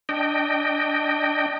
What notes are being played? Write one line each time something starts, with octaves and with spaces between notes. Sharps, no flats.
D4 D#5 G5